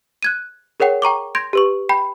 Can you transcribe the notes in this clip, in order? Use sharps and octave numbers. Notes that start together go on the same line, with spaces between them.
F#6 G#6 D#7
G#4 A#4 C#5 F#5 G5
G5 A#5 C#6 D6
C6 G6 G#6 A#6 D7
G4 B4 C#6
G5 B5 G6